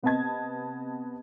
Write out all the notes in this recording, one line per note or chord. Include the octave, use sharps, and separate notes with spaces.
C3 B3 C4 D#5 A5 G#6